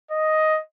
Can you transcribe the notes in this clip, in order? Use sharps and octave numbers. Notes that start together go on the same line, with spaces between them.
D#5